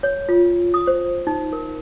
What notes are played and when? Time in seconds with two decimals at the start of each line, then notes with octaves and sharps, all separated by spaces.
0.03 C#5
0.29 F4
0.74 D#6
0.87 C5
1.27 D#4
1.53 A#4